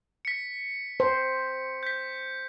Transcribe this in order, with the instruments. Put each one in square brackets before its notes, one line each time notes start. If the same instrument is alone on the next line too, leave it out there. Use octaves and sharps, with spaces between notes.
[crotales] B6 C#7
[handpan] C5
[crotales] G6 B6